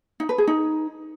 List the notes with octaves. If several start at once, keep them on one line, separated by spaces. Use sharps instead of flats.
D#4
B4
G#4
D#4